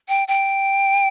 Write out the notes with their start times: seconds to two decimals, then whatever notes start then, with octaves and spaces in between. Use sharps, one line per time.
0.08 G5
0.28 G5